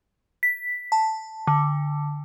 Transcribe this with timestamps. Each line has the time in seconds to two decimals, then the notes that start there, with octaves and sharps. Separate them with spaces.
0.43 B6
0.92 A5
1.47 D3